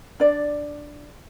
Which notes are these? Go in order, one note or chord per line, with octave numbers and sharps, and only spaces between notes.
D4 D5